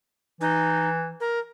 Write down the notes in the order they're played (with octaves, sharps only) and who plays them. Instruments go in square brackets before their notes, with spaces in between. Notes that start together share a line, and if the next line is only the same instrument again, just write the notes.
[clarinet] E3 [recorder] D#4
[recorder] A#4